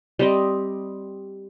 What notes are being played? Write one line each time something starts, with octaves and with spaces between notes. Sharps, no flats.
G3 C4 D#5